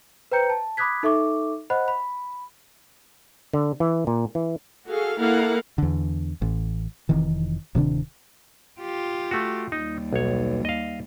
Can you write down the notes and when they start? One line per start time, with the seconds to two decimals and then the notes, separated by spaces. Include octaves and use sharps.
0.32 B4 C5 G5 A#5 G6 C#7
0.50 A5
0.77 B5 D6 D#6 F#6 G#6 B6
1.03 D#4 A4 E5 C#6 D6
1.70 C5 D#5 F#5 B5 F#6
1.88 B5
3.53 D3
3.80 E3
4.07 A#2
4.35 E3
4.88 F#4 G#4 A4 F5
5.19 A#3 E4 A4 A#4 F5 F#5
5.78 E2 D3
6.42 A1
7.09 F1 F2 D#3 E3
7.75 D1 C3 D#3 D4
8.81 F4 G4
9.31 A3 F#4
9.72 D#2 G3 D#4
10.13 B1 C#5
10.65 D#5 F5